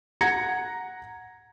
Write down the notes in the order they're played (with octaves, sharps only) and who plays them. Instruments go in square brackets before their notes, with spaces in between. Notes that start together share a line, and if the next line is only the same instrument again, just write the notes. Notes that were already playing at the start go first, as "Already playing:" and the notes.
[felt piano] F#5 A#5 G#6 A#6 C#7